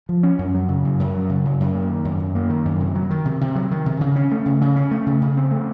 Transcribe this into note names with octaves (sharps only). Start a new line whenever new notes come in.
F3
C#4
F#2
F#3
C#3
F#2
F#2
F#3
C#3
F#2
F#2
A#3
D#3
F#2
F#2
A#3
D#3
F#2
C3
F#3
D#3
C3
C3
F#3
D#3
C3
C#3
C#4
A3
C#3
C#3
C#4
A3
C#3
C#3
C4
A3